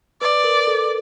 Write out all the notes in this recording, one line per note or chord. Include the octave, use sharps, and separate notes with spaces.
B4 D5
A#4
A4